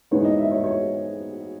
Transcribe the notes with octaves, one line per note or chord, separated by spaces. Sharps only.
G#2 E3 B3 D#4 C#5
D#5
E5
C#5
C#5